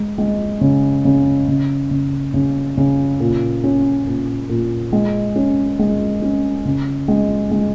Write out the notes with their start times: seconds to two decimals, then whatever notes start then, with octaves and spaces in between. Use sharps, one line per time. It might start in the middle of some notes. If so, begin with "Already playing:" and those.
Already playing: G#3
0.18 G#3
0.61 C#3
1.05 C#3
1.48 C#3
1.91 C#3
2.34 C#3
2.77 C#3
3.20 A#2
3.64 C#4
4.06 A#2
4.49 A#2
4.92 G#3
5.36 C#4
5.79 G#3
6.22 C#4
6.65 C#3
7.08 G#3
7.51 G#3